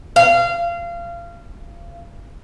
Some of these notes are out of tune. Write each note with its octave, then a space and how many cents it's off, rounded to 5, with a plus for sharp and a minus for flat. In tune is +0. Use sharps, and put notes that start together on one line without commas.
F5 -25